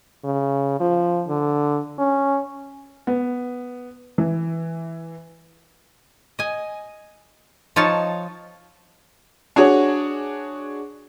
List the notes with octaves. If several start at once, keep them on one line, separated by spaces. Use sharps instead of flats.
C#3
F3
D3
C#4
B3
E3
D#5 G#5
F3 D#4 F4 C#5 A5
D4 F#4 G#4 C#5